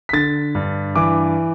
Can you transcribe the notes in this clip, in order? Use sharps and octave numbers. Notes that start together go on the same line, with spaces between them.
B6
D3 A6
G2
E3 D6